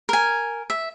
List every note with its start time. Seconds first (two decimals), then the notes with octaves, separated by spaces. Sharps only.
0.09 A#4 G#5
0.70 E5